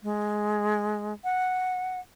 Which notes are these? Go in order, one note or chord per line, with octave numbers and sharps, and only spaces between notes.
G#3
F#5